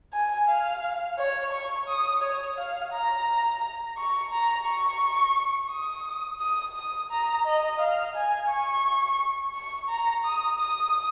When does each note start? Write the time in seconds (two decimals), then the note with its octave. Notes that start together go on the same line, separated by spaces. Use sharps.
0.14 G#5
0.48 F5
1.19 C#5
1.52 C#6
1.88 D#6
2.22 C#5
2.58 F5
2.92 A#5
3.97 C#6
4.32 A#5
4.66 C#6
5.71 D#6
6.40 D#6
6.76 D#6
7.11 A#5
7.46 D#5
7.80 F5
8.15 G#5
8.49 C#6
9.54 C#6
9.89 A#5
10.25 D#6
10.59 D#6